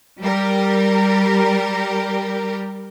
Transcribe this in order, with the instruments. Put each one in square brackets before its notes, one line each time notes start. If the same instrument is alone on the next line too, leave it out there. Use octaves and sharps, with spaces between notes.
[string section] G3 G4 A#4